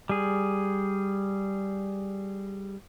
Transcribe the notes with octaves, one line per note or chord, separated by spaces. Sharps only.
G3 G#4